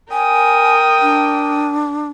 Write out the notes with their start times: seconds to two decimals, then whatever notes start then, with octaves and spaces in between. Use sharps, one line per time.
0.12 A#4 G5 G#5 D#6
1.02 D4